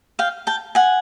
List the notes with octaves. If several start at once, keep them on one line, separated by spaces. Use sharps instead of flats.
F5 G5
G5 A5
F#5 G#5